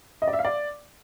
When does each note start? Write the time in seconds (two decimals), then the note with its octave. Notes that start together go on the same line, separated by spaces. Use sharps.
0.22 D#5
0.28 D5
0.33 E5
0.39 F5
0.45 D5